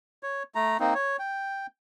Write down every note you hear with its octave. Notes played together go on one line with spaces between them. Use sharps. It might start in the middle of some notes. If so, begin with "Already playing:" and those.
C#5
A3 A#5
A#3 C4 D#4
C#5
G5